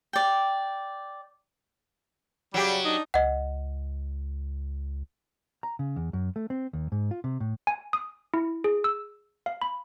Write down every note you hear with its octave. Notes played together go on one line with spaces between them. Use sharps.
D5 G5
C#3 F#3 G3 G4
D4 D#4
C#2 D#5 F#5
A#5
C#3
E2
F#2
A3
C4
D#2
G#2
F4
C3
A2
G#5
D#6
E4
G#4
E6
F5
B5